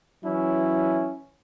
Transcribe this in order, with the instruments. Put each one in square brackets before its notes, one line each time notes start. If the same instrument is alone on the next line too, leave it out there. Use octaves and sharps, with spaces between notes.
[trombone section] E3 F#3 C#4 E4